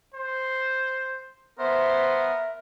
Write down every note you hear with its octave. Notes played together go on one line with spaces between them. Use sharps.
C5
B3 A#4 C5 E5